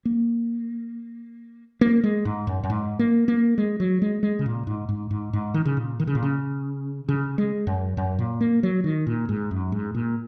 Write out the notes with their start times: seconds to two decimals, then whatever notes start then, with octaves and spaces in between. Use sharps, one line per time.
0.05 A#3
1.81 A#3
2.04 G#3
2.25 G#2
2.47 F#2
2.63 F#2
2.70 G#2
2.99 A#3
3.28 A#3
3.58 G#3
3.80 F#3
4.02 G#3
4.23 G#3
4.39 C#3
4.46 A#2
4.67 G#2
4.89 G#2
5.11 G#2
5.33 G#2
5.54 D#3
5.65 C#3
5.77 A#2
6.00 D#3
6.07 C#3
6.15 A#2
6.23 C#3
7.09 C#3
7.38 G#3
7.67 F#2
7.97 F#2
8.19 A#2
8.41 A#3
8.63 F#3
8.84 D#3
9.07 A#2
9.29 G#2
9.51 F#2
9.72 G#2
9.95 A#2